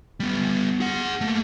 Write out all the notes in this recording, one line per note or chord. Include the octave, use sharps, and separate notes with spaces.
G3 B3
G#4 F#5
A3 A#3